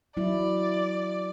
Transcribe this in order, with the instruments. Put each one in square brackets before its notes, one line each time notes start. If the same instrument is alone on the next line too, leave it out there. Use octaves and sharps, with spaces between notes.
[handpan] F#3 E4 [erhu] D5